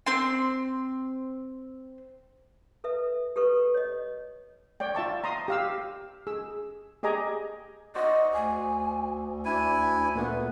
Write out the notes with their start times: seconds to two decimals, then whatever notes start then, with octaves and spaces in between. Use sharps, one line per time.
0.06 C4 C6
2.84 A4 B4 E5
3.36 G4 A4 B4 C#6
3.74 C#5 D#5
4.80 C#5 D5 G5
4.95 F4 E5 A5 C#6
5.24 A#5 C6 D#6
5.48 G4 F5 E6
6.27 G#4 E6
7.03 G4 G#4 D#5 G#5 A#5 D6
7.95 F#4 C5 D5 D#5
8.33 D2 G#5
9.45 D4 E4 G#5
10.15 A#2 A3 B3 B4